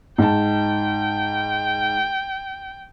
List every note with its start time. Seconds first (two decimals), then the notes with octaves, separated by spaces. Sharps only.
0.18 G#2 G5 A5